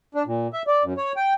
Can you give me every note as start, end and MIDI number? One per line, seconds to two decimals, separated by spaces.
0.15 0.23 62
0.26 0.47 46
0.53 0.62 76
0.67 0.83 74
0.83 0.94 42
0.97 1.13 73
1.16 1.33 79